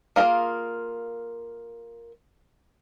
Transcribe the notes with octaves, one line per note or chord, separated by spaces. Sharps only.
A#3 F4 F#4 G#4 A#4